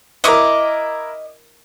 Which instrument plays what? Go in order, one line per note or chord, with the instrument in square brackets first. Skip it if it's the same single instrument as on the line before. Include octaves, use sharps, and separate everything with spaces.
[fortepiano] E4 A#4 [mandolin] D#5 D6